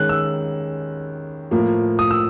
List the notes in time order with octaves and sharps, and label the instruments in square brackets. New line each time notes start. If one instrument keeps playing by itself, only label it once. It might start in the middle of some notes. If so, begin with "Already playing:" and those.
Already playing: [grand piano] D#3 G#3 C#4 F#6
E6
A2 F3 A#3
D#6
E6